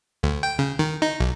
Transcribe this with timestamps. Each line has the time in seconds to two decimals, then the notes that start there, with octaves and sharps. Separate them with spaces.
0.23 D2
0.43 G5
0.59 C#3
0.79 D#3
1.02 D#4
1.20 B1